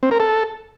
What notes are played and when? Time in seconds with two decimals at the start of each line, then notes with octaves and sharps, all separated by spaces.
0.03 C4
0.11 A#4
0.20 A4